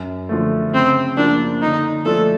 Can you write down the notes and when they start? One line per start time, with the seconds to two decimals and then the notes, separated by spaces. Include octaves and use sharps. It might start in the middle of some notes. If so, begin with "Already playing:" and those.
Already playing: F#2
0.29 D3 F3 A3
0.74 C#3 C4
1.17 F3 A#3 D4
1.62 D3 D#4
2.05 F3 A3 D4 A4